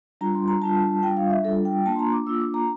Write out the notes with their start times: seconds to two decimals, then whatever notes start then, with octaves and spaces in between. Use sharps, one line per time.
0.21 G3 D4 F4 A#5
0.35 C6
0.48 A#5
0.62 G3 D4 F4 A5
1.03 G3 D4 F4 G5
1.17 F5
1.30 E5
1.44 G3 D4 F4 A4
1.65 G5
1.86 A#3 D4 F4 A5
1.96 C6
1.99 A#5
2.13 D6
2.27 A#3 D4 F4 E6
2.40 D6
2.54 A#5